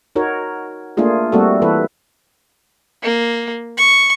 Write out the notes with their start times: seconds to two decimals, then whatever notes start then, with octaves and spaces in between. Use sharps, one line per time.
0.16 D#4 F#4 A#4 C#5
0.97 A3 A#3 D4 F4 G#4
1.32 G3 A3 A#3 C4 F#4 A4
1.62 E3 A4 B4
3.03 A#3
3.77 C#6